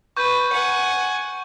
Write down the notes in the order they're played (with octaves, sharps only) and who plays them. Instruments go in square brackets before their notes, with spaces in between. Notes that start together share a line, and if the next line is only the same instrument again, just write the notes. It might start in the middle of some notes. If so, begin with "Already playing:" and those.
[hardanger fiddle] B4 [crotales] C#6 G6
[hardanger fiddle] F#5 G#5